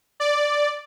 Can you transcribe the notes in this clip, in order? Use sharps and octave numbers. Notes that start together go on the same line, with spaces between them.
D5